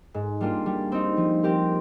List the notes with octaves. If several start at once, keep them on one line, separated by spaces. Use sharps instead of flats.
G#2
G3 A#3 D4 F4
G3
C4 D#4
F3
C4 G4 A#4